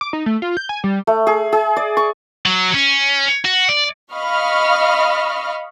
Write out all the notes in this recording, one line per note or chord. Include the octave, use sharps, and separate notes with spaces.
D6
D#4
A3
F4
G6
G#5
G3
A3
G#4
G#4
D5
C#6
F#3
C#4
F#4
D5
D#5 F5 B5 C#6 F6